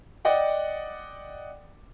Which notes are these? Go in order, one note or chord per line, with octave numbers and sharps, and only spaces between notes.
D5 D#5 F#5 G5